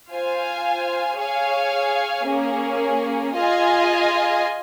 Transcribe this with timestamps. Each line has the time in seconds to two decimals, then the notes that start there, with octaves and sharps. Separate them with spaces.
0.13 F4 C5 F5 G#5
1.19 G#4 C#5 F5 G#5
2.28 A#3 C#4 G#4
3.35 F4 G#4 D#5 G#5